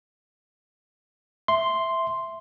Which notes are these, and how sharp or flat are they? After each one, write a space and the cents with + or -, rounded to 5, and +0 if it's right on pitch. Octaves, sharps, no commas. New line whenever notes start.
E5 +0 C6 +0